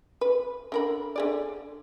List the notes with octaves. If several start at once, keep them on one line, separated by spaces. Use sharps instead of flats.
B4
D3 A#4 B5
D3 G#4 D5